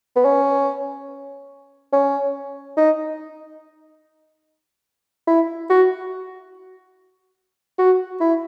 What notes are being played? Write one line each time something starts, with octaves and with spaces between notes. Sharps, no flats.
B3
C#4
C#4
D#4
E4
F#4
F#4
E4